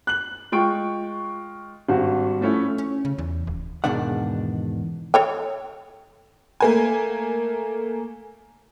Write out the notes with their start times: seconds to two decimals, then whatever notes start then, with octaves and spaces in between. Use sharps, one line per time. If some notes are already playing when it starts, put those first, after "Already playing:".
0.07 F#6 F#7
0.52 G#3 F4 G5 C#6 D7
1.89 G#1 G2 F#4
2.41 F3 A3 C#4 E4
2.78 C#4
3.05 C#3
3.18 E2
3.47 D#1
3.84 E2 G#2 B2 D#3 D4 F#5
5.14 A4 C#5 G5
6.60 A3 A#3 G#5